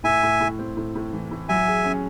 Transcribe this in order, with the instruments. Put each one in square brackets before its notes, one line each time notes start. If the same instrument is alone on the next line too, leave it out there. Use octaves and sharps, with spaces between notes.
[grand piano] A2 [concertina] E5 G#5
[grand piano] A2
A2
C4
A2
A2
E3
A2
[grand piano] F#3 [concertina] E5 G#5
[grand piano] G#4
C#4